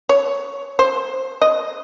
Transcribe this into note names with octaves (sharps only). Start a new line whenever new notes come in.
C#5
C5
D#5